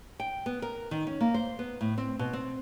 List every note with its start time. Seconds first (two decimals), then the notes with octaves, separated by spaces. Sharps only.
0.20 G5
0.46 B3
0.62 A#4
0.91 D#3
1.07 C#4
1.21 A#3
1.34 C5
1.59 B3
1.81 A2
1.98 C4
2.19 B2
2.33 C4